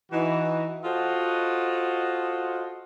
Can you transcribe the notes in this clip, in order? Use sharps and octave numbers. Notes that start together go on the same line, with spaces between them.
E3 D#4 F#4
F4 F#4 A4 C5 D#5 F#5